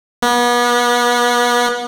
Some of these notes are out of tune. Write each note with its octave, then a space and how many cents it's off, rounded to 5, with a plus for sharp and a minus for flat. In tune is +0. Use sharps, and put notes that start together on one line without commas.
B3 -35